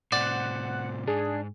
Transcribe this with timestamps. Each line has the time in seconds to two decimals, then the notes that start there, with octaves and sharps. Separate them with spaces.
0.12 A2 C3 C5 D5 F#5
1.07 G#2 D4 G#4